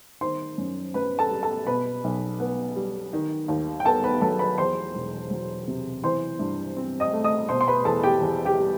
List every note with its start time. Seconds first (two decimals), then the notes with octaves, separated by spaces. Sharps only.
0.21 D#3 C5 C6
0.58 F#2
0.94 F#2 B4 B5
1.19 A4 A5
1.30 G3
1.43 A4 A5
1.67 B2 B4 B5
2.04 B1
2.40 B3
2.76 G3
3.13 D#3
3.48 D#2
3.80 G5
3.85 B3 A4 A5
4.04 B4 B5
4.21 F#3 A4 A5
4.39 B4 B5
4.58 E2 C5 C6
4.95 E1
5.31 F#3
5.68 C3
6.03 E3 C5 C6
6.39 G2
6.77 C4
7.00 D#5 D#6
7.13 A3
7.24 D#5 D#6
7.49 B2 C5 C6
7.61 C6
7.68 B4 B5
7.85 E2 A4 A5
8.03 G4 G5
8.22 E2
8.45 G4 G5
8.58 G3